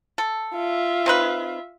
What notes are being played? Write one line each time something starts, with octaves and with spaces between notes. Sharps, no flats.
A4
F4 E5
C4 D#4 B4